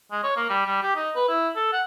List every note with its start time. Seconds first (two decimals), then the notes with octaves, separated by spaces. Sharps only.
0.11 G#3
0.23 C#5
0.36 A#3
0.49 G3
0.66 G3
0.83 G4
0.96 D#4
1.15 B4
1.28 E4
1.56 A4
1.73 F#5